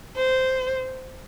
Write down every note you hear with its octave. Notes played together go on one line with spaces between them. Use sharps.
C5